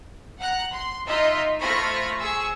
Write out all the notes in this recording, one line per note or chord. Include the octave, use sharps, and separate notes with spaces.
F#5 A#5 F#6
C6
D#4 F4 D#5 E5 C6
A3 F4 C5 B5 C#6 A#6
G#4 C#6 E6